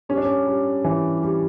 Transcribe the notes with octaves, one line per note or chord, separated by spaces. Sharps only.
G3 C#4
D4
C#4
G3
E3
G3